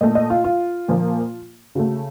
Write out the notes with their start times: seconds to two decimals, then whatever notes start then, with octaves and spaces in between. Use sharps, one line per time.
0.01 A#2 A3 D#5
0.15 D#5
0.30 F4
0.44 F4
0.88 A#2 F3 A#3
1.75 C#3 A3 F#4